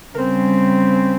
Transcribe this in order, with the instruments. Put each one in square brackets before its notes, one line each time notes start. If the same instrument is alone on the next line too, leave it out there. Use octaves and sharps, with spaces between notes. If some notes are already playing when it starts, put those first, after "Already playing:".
[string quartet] C#3 G3 C4 A#4